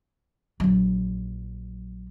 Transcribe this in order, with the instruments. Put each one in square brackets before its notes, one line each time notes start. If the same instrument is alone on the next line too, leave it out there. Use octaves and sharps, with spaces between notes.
[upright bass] A#1 F#3